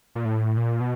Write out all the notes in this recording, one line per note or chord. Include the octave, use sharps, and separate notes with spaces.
A#2
A2
A#2
B2